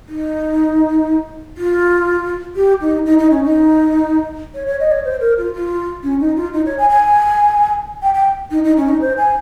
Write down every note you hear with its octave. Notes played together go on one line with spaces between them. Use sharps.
D#4
F4
G4
D#4
D#4
D#4
C#4
D#4
C#5
C#5
D#5
C#5
C5
A#4
F4
F4
C#4
D#4
F4
D#4
C#5
G#5
G#5
G5
G5
D#4
D#4
C#4
D#4
C5
G#5